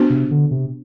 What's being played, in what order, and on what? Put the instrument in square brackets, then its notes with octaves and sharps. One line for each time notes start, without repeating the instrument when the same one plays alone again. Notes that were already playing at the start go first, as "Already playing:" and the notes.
Already playing: [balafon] B3 D4 F#4 C5
[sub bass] C3
D3
C3